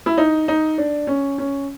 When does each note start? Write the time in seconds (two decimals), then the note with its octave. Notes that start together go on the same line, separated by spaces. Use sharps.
0.06 E4
0.18 D#4
0.48 D#4
0.78 D4
1.07 C#4
1.38 C#4